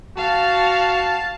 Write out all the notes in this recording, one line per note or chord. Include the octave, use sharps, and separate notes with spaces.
F#4 F5 A5